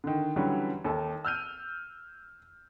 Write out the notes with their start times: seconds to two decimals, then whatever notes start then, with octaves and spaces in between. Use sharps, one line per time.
0.04 D3 D#3
0.36 D3 E3 F#3 G3 C#4
0.84 D#2 A4
1.25 E6 F6 G6 D#7